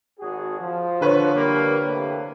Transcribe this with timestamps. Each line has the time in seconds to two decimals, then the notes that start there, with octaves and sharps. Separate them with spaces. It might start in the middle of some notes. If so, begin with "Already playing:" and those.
0.20 G#1 F#4 G#4
0.60 F3
1.01 D3 B4 C#5
1.34 G3 A#3
1.84 A2 C3 A#3